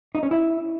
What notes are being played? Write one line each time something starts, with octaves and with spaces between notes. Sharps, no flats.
D#4
C#4
E4